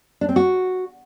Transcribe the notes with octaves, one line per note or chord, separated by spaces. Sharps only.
D4
C4
F#4